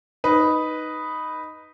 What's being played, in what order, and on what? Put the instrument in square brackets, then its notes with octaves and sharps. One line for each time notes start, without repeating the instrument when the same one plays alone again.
[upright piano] D#4 B4